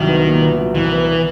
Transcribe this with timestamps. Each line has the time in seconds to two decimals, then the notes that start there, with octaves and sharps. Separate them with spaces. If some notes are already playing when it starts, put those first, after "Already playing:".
Already playing: C2 D#3 F#3
0.09 B3
0.26 A#2
0.42 B3
0.59 F#3
0.75 C2 E3
0.92 B3
1.08 B3